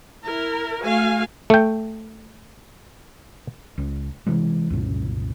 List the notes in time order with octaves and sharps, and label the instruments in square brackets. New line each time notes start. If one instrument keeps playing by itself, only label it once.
[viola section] E4 A#4
A3 F#4 F5 G#5
[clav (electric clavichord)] A3 G5
[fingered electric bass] C#2
C3 E3 G#3
C2 F#2 A#2 C#3